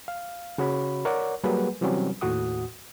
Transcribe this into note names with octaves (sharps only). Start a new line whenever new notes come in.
F5
C#3 F#4 C#5 B5
A#4 C#5 D5 F#5
F#3 G3 A#3 G#4 B4 F#5
C3 E3 F#3 G3 C4 C#4
D#2 A2 F#4 F#5 D#6